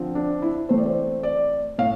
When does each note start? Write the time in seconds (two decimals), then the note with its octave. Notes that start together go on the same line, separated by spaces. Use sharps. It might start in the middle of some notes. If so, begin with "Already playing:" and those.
Already playing: D3 F3 C4
0.15 D4
0.42 E4
0.69 E3 A3 C4 C5
0.78 D5
0.86 C5
1.23 D5
1.78 A2 F5